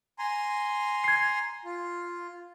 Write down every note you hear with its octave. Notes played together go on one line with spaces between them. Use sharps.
G#5 A#5 C6
G#6 C7
F4